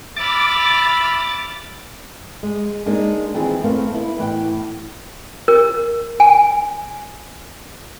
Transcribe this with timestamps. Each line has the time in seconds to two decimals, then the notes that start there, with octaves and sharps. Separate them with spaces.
0.16 E5 B5 D6 F6 A6
2.43 G#3
2.86 G#3 A#3 D4 D#4
3.34 D#3 E3 C4 F4 G#4
3.64 A3 B3 C4 A#4 F5
3.92 B3 E4
4.18 A2 E3 F#5 G5
5.48 A#4
6.20 G#5